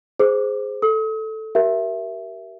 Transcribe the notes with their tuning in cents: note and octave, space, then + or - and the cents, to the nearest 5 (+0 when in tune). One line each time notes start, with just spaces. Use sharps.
G#4 +0 C5 -10 D6 +25
A4 +0 D#6 +40
G4 -35 A#4 +10 E5 +10